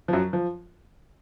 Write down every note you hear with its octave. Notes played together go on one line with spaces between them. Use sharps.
F3
F#2 F#3
F3